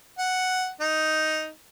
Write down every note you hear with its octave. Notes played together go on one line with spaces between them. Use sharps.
F#5
D#4